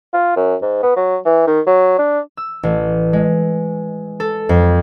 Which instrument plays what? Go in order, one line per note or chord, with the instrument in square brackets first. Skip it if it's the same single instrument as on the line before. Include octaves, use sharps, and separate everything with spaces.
[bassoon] F4
F#2
G#2
B3
F#3
E3
D#3
F#3
D4
[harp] E6
A1
G#3
A4
F2